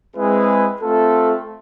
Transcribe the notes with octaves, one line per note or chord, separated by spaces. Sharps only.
G#3 C4 E4 G#4 B4
A3 C4 F4 A4